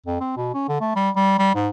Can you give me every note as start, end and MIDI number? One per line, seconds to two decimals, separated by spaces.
0.06 0.18 41
0.20 0.35 60
0.37 0.51 47
0.54 0.68 61
0.68 0.79 50
0.81 0.91 57
0.96 1.10 55
1.15 1.37 55
1.39 1.55 55
1.55 1.68 44